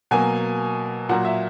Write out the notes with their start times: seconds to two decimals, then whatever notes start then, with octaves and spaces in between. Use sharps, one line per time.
0.11 B2 F#3 A#3 G#5
1.09 A#2 F#3 A#3 F#5
1.25 E5